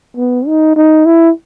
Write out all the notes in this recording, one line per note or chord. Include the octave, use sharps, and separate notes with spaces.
B3
D#4
D#4
E4